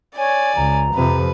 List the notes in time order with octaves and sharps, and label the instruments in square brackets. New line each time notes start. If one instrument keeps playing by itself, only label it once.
[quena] C#5 [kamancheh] D5 G#5
[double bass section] C#2 [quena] A#5
[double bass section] F2 C3 F3 [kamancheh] B4